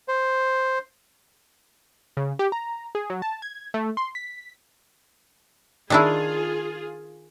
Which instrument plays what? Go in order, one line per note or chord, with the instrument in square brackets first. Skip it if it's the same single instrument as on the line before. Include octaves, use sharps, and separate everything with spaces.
[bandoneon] C5
[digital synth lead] C#3
G4
A#5
G#4
F#3
A5
G#6
A3
C6
B6
[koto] D#3 D4 E4 [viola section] F4 G#4